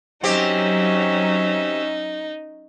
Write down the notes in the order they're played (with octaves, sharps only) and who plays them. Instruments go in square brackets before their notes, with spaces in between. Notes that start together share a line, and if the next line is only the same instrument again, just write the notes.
[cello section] F#3 [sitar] C4 G4 [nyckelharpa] C#4 E5 [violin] D#4